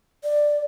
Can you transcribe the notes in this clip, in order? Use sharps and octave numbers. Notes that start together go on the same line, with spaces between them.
D5